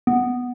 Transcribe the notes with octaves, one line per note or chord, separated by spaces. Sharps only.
B3